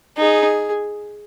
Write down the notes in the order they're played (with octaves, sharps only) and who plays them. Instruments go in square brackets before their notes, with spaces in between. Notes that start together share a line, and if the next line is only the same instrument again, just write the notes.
[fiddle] D#4 [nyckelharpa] G#4